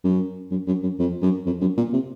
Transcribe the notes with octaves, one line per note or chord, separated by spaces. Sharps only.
F#2
F#2
F#2
F#2
F2
F#2
F2
F#2
A#2
C3